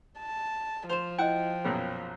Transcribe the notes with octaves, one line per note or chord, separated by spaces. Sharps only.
A5
F3 C5 E7 F7
E4 D#5 F#5 G5
A#1 F#2 B2 C#5